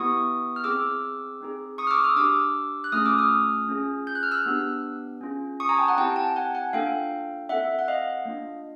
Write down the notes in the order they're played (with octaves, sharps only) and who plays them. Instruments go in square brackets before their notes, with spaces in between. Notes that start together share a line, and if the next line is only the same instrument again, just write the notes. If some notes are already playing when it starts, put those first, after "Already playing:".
Already playing: [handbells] B3 E4 G4 C#6 D#6
F6
C4 E4 G#4 D6 E6
C4 D#4 G#4
C#6 D#6
F6
D6 E6
D#6 F6
D4 G4 D6 E6
F#6
A3 C#4 F4 G#4 D#6 F6
D6 E6
D#6 F6
C#4 F4 G#4
G6
F#6
F6
E6 F#6
B3 D4 G4
C#4 F4 G#4
C#6 D#6
G#5 A#5
G5 A5
F#5 G#5
C4 E4 G4 G5 A5
G5 A5
F#5 G#5
F#5 G#5
A#3 D4 F4 A4 F5 G5
C4 E4 A4 E5 F#5
F#5
D#5 F5
A#3 D4 F4